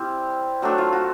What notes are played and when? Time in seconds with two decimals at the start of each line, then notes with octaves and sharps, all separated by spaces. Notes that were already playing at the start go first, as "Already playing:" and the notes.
Already playing: G3 C4 E4 G4
0.62 F#3 A3 D4 F#4
0.78 F4
0.93 F#4